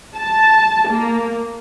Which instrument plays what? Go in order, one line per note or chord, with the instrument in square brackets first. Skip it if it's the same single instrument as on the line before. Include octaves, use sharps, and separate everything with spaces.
[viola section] A5
A#3